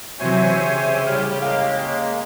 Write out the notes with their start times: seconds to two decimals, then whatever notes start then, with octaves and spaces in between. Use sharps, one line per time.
0.20 C3 E3 F#3 C5 C#5 E5 G#5
0.54 C#3 G4
1.07 A2 G3 C#5 F6
1.42 G#3 A#3 F5